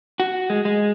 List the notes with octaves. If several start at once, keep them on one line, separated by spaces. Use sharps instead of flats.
F#4
G#3
G#3